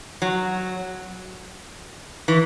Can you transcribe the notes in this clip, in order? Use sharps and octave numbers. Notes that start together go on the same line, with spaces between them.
F#3
E3